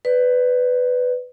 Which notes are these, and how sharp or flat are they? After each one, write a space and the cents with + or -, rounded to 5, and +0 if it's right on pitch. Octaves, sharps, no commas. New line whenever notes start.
B4 +15 D5 +0